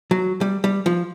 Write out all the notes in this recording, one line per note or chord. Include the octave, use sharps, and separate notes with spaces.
F#3
G3
G3
F3